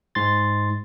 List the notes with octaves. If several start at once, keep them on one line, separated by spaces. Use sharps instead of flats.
G#2 C6 A6